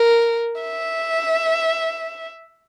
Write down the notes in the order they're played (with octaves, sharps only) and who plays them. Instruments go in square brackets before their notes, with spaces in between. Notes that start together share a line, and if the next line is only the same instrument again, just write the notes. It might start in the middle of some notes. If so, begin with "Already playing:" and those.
Already playing: [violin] A#4
E5